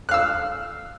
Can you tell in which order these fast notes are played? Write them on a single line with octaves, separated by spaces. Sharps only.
F#6 F5 E6